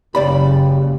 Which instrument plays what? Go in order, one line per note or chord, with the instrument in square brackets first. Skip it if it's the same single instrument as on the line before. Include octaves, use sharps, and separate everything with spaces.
[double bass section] F#1 C#3 [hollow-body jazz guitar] C#2 D5 B5 [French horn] G4